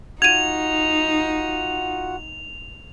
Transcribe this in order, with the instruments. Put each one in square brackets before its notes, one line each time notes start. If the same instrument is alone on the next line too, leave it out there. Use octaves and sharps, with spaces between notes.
[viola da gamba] D#4 [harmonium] F4 F#4 F#5 [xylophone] G#6 D#7 [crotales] F7